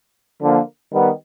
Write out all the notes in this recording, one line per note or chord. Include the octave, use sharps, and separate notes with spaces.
D3 F3 A#3
D#3 G3 B3